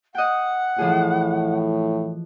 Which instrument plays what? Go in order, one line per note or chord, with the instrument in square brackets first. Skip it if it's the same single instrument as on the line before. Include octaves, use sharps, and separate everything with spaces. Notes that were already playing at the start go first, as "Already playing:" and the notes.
[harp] D#5 G5 [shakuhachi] F#5
[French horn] A2 [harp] E3 F3 G#4